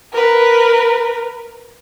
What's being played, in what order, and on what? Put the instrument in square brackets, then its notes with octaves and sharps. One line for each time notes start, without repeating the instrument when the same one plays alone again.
[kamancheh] A#4 B4